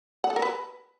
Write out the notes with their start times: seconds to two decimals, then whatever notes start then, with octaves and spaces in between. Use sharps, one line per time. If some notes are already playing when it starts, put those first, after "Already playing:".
0.24 F#5
0.30 A4
0.36 A#4
0.42 B4